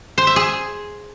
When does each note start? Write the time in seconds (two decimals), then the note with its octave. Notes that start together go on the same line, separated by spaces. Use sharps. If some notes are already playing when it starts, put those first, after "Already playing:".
0.18 C5
0.27 E5
0.36 G#4